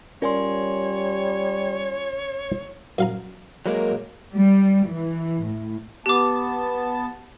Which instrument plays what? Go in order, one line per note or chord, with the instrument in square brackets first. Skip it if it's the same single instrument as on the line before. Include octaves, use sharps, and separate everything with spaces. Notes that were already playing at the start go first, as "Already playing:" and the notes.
[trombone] G3 [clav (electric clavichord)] C#4 A#4 D5 [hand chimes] F4 G#5 C6 [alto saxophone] C#5
[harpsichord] F#2 F5 A#5
[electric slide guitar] F#3 G#3 A#3 [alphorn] A#4
[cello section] G3
E3
A2
[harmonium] B3 A5 [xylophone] G4 D6